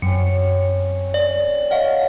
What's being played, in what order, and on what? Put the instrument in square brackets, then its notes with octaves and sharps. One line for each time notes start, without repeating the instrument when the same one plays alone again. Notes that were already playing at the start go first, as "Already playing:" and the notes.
[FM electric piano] F#2 [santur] C4 C#4 [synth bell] C#7
[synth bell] D5
[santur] C#5 B5 [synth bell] D#5 F#5 [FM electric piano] F5